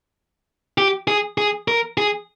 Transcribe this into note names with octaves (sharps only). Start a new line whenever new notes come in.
G4
G#4
G#4
A#4
G#4